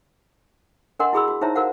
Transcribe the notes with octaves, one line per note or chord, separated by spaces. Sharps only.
D4 A#4 D#5 F#5 C6
E4 F#4 G#4 B5 C6 E6
F#4
D#4 E4 C5 C#5 E5 A#5
F#4 A#4 C5 F5 F#5